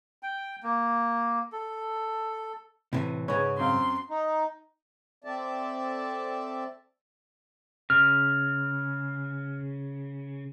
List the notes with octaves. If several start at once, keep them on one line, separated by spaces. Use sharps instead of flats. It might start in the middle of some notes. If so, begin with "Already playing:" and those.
G5
A#3
A4
A2 C3 E3
G#2 C#3 C#4 B4 C#5
F#2 C4 F5 C6
D#4
C4 A4 D5 E5 A5
C#3 F6